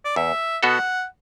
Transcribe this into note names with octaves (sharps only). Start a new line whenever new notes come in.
D5
E2 E5
B2 B3 F#4 A4 F#5